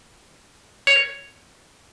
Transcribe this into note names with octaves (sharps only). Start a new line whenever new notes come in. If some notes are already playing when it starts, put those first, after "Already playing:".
C#5